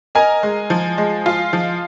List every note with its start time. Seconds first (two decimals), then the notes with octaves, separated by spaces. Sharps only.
0.15 A#4 D#5 G#5
0.43 G#3
0.70 F3
0.98 G#3
1.26 F4
1.53 F3